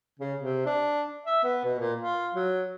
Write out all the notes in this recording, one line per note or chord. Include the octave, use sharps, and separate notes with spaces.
C#3
C3
D4
E5
B3
B2
A#2
F4
F#3